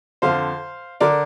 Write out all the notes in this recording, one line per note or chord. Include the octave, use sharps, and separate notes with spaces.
F2 D3 C5 F5
D3 A#4 D5